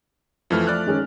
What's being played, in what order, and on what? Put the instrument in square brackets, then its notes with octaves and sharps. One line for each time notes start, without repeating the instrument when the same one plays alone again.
[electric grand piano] F2 E3 F6 [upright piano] F3 A3
[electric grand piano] D5 F#6
[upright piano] D#3 G#3 C#4